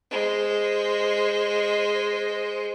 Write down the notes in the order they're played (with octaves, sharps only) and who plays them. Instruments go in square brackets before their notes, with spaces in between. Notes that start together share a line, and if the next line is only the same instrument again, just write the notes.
[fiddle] G#3 C5